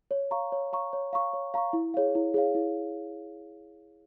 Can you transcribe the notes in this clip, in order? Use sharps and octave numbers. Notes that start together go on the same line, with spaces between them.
C#5
F5 A#5 C#6
C#5
F5 A#5 C#6
C#5
F5 A#5 C#6
C#5
F5 A#5 C#6
E4
G#4 C#5 F5
E4
G#4 C#5 F5
E4